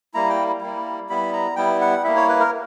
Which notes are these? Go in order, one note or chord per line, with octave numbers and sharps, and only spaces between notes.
G3 A#3 E4 A#5
G5
G3 A#3 E4
G3 B3 E4 B5
A#5
G3 B3 E4 G5
F#5
A#3 E4 E5
C#5
B4
A#4